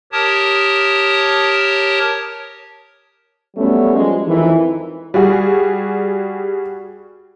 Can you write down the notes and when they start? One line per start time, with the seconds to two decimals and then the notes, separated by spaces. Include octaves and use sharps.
0.12 G4 A#4 C#5 A5 D#6
3.56 F#3 G3 A3 B3 C#4
3.95 F3 G3 G#3
4.27 F2 D#3 E3
5.14 G3 F#4 G#4